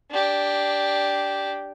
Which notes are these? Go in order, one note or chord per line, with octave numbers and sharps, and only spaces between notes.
D4 G4